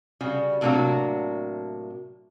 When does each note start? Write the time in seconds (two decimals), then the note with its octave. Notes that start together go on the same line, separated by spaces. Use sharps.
0.21 C#3 G3 F#4
0.61 A2 C3 F#3 A#3 D4 F#4